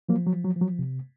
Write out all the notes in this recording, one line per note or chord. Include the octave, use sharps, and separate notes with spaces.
F3 F#3 A#3
F#3
F3
F#3
F3
F#3
C3